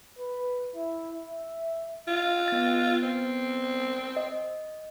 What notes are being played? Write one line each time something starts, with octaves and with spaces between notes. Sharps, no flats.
B4
E4
E5
F4
B3 A6
C4
D#5